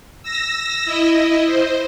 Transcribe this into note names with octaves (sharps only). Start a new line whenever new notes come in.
E6 A#6
E4 D#5
C5